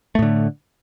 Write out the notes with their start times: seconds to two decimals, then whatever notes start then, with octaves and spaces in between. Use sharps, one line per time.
0.15 A3
0.19 A2
0.22 D3